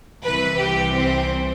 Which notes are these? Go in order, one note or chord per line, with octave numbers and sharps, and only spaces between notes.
C2 C3 E3 B4
G4
C4